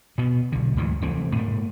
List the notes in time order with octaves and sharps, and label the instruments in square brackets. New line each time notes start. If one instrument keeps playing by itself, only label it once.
[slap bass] B2 B3
B1 D3
D2 G#2 E3 F#3
F1 E3 A3 C4
G#2 A3 A#3